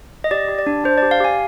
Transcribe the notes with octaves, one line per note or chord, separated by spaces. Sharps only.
D#5
G4 D5
G4
D5
D4
D4 C5
G4 D5
F5
G4 G#5